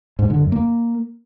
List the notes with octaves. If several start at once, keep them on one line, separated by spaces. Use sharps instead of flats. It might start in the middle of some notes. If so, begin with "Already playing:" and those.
G#2
D3
F#2
A#3